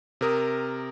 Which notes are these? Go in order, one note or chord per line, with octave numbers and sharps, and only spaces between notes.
C3 A#4 D#6